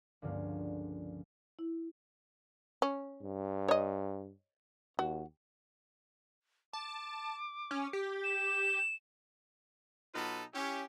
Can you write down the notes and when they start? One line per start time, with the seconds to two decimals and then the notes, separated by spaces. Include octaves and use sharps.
0.22 C#2 G2 D3 F3 A#3 C#4
1.59 E4
2.82 C#4
3.22 G2
3.68 C#5 D#5
4.99 D#2 F#4
6.73 A5 D6
7.71 C#4
7.93 G4
8.24 E7
10.15 B2 F#3 D#4 F4 A4 B4
10.53 C#4 E4 G4